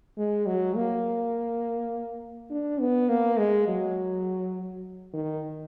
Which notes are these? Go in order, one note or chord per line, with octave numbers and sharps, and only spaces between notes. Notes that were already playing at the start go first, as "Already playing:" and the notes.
G#3
F#3
A#3
D4
B3
A#3
G#3
F#3
D#3